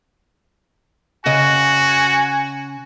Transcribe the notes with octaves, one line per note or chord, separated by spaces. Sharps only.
C#3 F#4 D#5 G#5